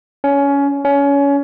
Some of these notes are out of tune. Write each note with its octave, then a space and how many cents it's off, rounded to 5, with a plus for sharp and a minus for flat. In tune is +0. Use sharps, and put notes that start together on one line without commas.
C#4 +20
C#4 +25